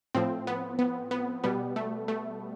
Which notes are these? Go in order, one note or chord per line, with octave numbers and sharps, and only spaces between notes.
A2 F3 C4
B3
B3
B3
B2 G3 B3
A3
A3